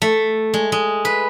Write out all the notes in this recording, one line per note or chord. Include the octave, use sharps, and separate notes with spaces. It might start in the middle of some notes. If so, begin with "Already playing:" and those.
A3
G#3
G#3
B4